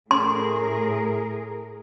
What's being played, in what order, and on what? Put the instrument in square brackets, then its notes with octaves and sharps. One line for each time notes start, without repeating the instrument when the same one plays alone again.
[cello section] A2 G#4 A#4 [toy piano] C6